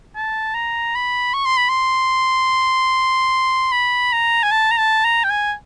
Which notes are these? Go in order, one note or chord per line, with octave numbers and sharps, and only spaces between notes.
A5
A#5
B5
C#6
C6
B5
C6
B5
A#5
G#5
A5
A#5
A5
A#5
G5
G#5